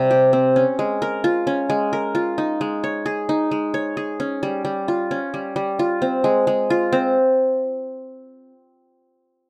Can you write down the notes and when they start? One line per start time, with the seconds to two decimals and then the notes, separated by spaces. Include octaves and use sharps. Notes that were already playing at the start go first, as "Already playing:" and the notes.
Already playing: C3 G3 C4
0.11 G4
0.33 C4
0.56 C#4
0.79 G#3
1.02 A#4
1.24 F4
1.47 C#4
1.70 G#3
1.93 A#4
2.15 F4
2.38 D#4
2.61 G#3
2.84 C#5
3.06 G#4
3.29 D#4
3.51 G#3
3.74 C#5
3.97 G#4
4.20 C#4
4.43 G3
4.65 G3
4.88 F4
5.11 C#4
5.34 G3
5.56 G3
5.79 F4
6.02 C4
6.24 G#3
6.47 G#3
6.70 F4
6.93 C4